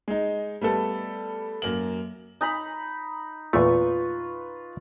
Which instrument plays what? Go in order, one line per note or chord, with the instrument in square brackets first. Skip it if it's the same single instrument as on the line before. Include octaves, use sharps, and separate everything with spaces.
[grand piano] G#3 D#4
G3 A3 B3 A4
F#2 A#3 F#7
[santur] D#4 A#5 B5
[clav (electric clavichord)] E2 A#2 A3 [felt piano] F4 B4 [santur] C#6